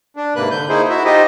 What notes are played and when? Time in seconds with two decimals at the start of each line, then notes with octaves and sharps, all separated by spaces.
0.16 D4
0.36 G#2 C3 A#3 B4 F#6
0.51 D3 G6
0.69 A#3 D#4 E4 G#4 C5
0.90 E4 F#4 E5
1.05 D#4 F4 G4 C5 D#5